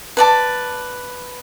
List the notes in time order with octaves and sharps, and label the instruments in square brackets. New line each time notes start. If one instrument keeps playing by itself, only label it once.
[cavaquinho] B4 D5 A5